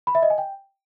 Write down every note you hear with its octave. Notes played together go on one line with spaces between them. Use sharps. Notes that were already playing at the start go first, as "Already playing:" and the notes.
B5
E5
D#5
G#5
G5